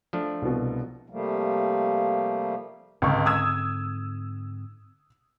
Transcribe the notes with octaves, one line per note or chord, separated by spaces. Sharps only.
F3 A3 D4
C2 B2
C3 F3 G3 A3 A#3
C#2 G#2 D3 C4 C#6
D#6 E6 G#6